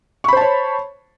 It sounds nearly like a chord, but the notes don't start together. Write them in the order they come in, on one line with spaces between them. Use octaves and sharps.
C#6 B5 C5 A5 C#5